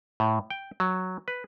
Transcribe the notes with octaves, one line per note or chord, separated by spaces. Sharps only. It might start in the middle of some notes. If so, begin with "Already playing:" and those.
A2
G5
F#3
B4